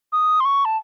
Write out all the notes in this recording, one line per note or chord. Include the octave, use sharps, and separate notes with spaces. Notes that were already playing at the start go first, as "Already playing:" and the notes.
D#6
C6
C#6
A5